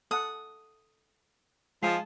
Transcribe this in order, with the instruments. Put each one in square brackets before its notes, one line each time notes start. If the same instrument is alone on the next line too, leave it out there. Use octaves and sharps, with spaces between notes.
[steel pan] A4 F#5 [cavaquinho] D#6
[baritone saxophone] F3 [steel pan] G#3 A5 [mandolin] F5 G#5 D#6